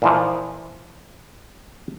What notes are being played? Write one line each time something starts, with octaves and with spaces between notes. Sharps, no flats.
A#2 E3 F3